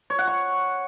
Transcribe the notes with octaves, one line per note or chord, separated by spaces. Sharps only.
C#5
F#5
C#6